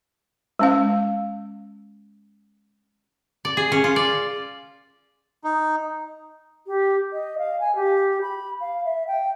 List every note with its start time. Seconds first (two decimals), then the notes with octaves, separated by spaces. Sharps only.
0.59 G#3 C#4 F5
3.45 D5
3.57 G#4
3.72 C#4
3.84 F4
3.96 D5
5.44 D#4
6.67 G4
7.13 D#5
7.38 F5
7.60 G#5
7.76 G4
8.22 B5
8.61 F5
8.85 E5
9.07 G5